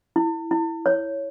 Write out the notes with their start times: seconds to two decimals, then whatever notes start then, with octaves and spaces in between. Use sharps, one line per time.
0.16 E4
0.51 E4
0.86 C#5